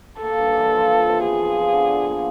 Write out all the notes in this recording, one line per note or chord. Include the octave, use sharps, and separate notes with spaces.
A#3 A4
G2
E3
F3
F3
C3
B3 G#4
F3
F3
D3
D3
A#3